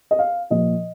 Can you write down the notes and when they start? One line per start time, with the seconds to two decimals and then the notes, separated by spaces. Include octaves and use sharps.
0.11 D#5
0.19 F5
0.50 A#2 F3 D#5